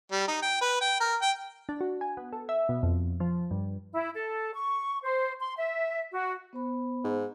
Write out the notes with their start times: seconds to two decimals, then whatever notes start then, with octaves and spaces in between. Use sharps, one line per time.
0.11 G3
0.27 D#4
0.42 G5
0.61 B4
0.81 G5
1.00 A#4
1.21 G5
1.69 D4
1.81 F#4
2.01 G#5
2.17 B3
2.33 A4
2.49 E5
2.69 B2
2.83 F2
3.20 F3
3.51 G2
3.94 E4
4.15 A4
4.54 C#6
5.03 C5
5.41 C6
5.57 E5
6.12 F#4
6.53 B3 C5 B5
7.04 G#2